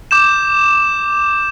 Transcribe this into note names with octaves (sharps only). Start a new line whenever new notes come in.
D6 G6 E7